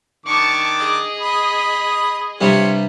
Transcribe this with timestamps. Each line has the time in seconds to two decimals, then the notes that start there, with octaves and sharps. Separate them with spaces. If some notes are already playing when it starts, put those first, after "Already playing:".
0.26 D#3 D4 A5 C#6 D6
0.77 G#4 D#5
1.21 B5 D#6
2.41 G2 C3 G3 F4 C#5